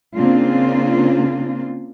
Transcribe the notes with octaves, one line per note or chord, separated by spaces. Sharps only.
C#3 A#3 C4 D4 F4